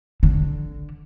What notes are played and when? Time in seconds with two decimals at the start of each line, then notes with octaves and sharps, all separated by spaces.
0.23 D3